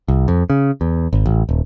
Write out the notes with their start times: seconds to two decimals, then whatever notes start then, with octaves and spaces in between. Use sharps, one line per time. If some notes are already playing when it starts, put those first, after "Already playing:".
0.08 C2
0.28 F2
0.50 C#3
0.81 E2
1.13 G#1
1.26 A1
1.49 D#1